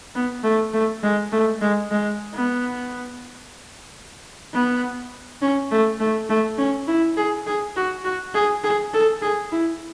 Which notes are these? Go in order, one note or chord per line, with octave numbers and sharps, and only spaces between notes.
B3
A3
A3
G#3
A3
G#3
G#3
B3
B3
C#4
A3
A3
A3
C#4
E4
G#4
G#4
F#4
F#4
G#4
G#4
A4
G#4
E4